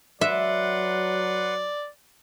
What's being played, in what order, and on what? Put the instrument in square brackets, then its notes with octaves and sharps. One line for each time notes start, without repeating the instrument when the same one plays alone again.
[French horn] F#3 [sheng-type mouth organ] B4 F#5 C6 [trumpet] D5 [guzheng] E5